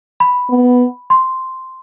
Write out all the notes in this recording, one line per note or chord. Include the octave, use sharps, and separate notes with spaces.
B5
B3
C6